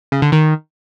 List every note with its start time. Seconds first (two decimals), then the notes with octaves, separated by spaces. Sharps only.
0.12 C#3
0.22 D3
0.32 D#3